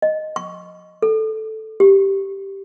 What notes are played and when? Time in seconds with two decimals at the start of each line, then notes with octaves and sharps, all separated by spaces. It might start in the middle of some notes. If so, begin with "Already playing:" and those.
0.02 D#5
0.36 C#6
1.02 A4
1.80 G4